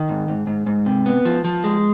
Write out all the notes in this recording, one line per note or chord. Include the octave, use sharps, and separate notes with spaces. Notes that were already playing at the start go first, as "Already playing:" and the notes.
Already playing: D#3
G#2
G#2
G#2
G#2
C3
B3
F3
F3
G#3